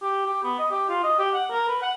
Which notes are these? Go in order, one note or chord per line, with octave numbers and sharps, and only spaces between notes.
G4
G4
B3
D#5
G4
F4
D#5
G4
F#5
A#4
B4
F#5